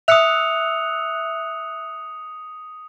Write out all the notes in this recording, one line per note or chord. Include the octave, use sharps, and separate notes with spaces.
E5 D#6 E6 F#6 C#7 F7